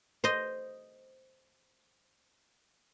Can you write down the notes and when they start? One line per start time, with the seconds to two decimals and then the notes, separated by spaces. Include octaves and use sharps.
0.24 C5 D#5